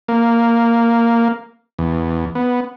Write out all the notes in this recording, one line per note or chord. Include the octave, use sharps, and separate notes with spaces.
A#3
E2
B3